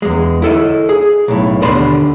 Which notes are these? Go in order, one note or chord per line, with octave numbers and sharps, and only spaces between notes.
E2 G#3
E4 A4 D#5
G#4
B1 A2
D#2 B2 D3 D5 B5 C6